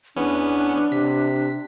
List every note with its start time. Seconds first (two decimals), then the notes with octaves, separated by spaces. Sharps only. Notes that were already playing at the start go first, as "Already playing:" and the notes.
0.16 E2 B3 C#4 D4
0.92 C3 B6